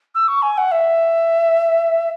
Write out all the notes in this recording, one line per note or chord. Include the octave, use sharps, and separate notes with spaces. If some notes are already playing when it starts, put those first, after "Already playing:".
E6
C#6
G#5
F#5
E5